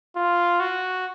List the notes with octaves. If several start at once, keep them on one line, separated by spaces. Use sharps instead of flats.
F4
F#4